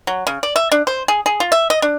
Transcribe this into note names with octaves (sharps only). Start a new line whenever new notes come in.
F#3
C#3
D5
E5
D4
C5
G#4
G#4
F4
E5
D#5
D4